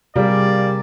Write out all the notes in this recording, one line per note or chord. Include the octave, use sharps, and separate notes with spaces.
C3 G3 A#3 G#4 D5